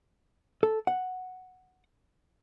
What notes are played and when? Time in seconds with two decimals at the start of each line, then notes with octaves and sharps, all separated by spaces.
0.63 A4
0.87 F#5